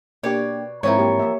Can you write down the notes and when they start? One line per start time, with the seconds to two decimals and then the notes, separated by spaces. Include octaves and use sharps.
0.23 B2 A#3 D4 G4 C#5 D5
0.83 G#2 E3 F3 C4 E4 A#4 C#5
0.99 A#3 G4
1.19 A#3 E5